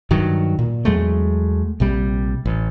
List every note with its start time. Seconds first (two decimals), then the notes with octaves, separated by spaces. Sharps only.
0.11 G2 D#3 F#3
0.59 A#2
0.85 E2 F#3 G#3 A3
1.80 A#1 C3 G3
2.46 A1